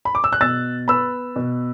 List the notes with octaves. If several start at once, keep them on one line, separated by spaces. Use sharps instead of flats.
B5
D6
E6
F#6
B2 E6 A6
B3 B5 E6
B2